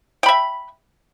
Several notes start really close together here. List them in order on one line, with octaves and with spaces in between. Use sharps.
G5 B5 E5